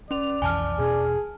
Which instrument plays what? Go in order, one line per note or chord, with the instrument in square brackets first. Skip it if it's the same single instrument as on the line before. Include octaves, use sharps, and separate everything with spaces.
[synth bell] C#4 F7 [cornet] D5
[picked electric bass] B1 F2 E3 [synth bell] G#5 A5 F6
[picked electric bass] E2 B2 C#4 [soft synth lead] G#4